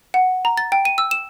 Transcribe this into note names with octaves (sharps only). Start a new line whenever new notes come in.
F#5
A#5
A6
G5
D#7
E6
E7